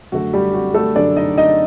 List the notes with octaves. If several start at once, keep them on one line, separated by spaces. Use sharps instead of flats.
F#2 D3 A3 F#4
G3 G4
F#4
A3 A4
F#2 D3 A3 D4 D5
D#4 D#5
D#4 D#5